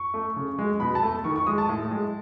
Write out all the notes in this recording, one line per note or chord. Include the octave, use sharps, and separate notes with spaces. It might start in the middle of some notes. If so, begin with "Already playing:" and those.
Already playing: C#6
A3
C#3
G#3
B2 B5
A5
A3
D#3 C#6
C#6
G#3 D#6
A5
A2
G#3